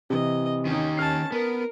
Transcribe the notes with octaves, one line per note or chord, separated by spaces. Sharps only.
C3 E3 D#5
D#3 C#4 D#4 G4
C#4 A5 F6 C7
B3 A#4